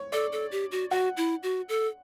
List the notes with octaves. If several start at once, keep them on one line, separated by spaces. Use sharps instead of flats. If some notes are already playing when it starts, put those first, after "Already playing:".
Already playing: C#5
A4 D5
A4
G4
F#4
F#4 F#5
E4
F#4
A4